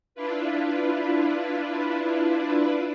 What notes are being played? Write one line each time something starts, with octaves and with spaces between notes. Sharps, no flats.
D4 E4 F4 B4